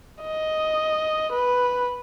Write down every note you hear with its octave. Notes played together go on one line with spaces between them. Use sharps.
D#5
B4